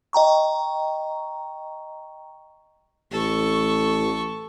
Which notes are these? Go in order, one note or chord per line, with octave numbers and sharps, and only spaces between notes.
D#5 G5 A#5 C#6
A1 A4 C#6